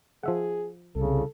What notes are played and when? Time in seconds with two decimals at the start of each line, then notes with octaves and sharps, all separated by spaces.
0.23 F3 G#4 E5 F#5
0.95 C2 C#3 A4